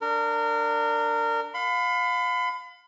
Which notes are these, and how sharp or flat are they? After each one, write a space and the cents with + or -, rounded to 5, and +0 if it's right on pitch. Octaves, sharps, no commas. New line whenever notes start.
D4 +0 A#4 -25
F5 +30 B5 +35